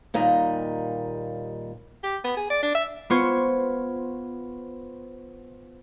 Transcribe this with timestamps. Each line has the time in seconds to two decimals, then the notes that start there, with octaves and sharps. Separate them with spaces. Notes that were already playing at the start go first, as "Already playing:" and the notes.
0.14 D#2 A#2 G3 D#5 A#5
2.04 G4
2.25 B3
2.37 G#4
2.51 D5
2.63 D4
2.75 E5
3.10 B3 F4 C5 C#6 G#6